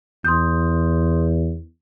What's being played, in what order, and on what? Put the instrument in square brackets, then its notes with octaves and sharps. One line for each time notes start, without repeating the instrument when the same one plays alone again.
[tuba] E2 [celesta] C6 D#6 G6